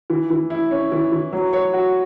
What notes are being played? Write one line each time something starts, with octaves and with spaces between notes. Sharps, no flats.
E3
E3
E4
C#4
E3
E3
F#3
C#5
F#4